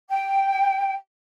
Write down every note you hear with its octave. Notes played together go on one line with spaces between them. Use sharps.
G5